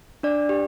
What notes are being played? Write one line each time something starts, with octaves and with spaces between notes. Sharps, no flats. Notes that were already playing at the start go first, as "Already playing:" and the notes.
D4 D5
G4